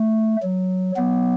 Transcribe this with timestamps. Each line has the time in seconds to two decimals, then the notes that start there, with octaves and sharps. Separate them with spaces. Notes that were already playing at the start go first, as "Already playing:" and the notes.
Already playing: A3
0.42 F#3
0.96 F#3 B3